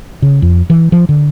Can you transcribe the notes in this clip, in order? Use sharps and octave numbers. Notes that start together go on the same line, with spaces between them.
C#3
F2
E3
F3
D3